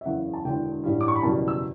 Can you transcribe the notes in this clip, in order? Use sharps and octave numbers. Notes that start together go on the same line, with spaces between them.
E5
F#1 E2 C#3 F#5
A5
E1 E2 D3 G5
A1 G2 E3 G3
D6
C#6
B5
F#1 E2 B2 G3 A5
E6